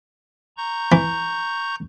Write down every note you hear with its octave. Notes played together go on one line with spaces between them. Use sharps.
A#5 C#6 G6
E3